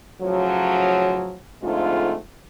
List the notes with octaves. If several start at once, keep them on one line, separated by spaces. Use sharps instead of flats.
A2 C#3 F3 F#3
F2 G#2 D3 G#3 A3 F4